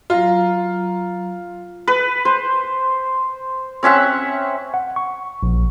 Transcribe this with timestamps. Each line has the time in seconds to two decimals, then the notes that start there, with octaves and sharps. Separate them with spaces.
0.10 F#3 F4 A#5
1.87 B4
2.25 C5
3.83 C4 C#4 E5 F#5
4.74 F#5
4.96 C#6
5.43 A#1